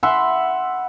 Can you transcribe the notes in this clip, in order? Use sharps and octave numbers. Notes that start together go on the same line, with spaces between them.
E5 F#5 B5 C6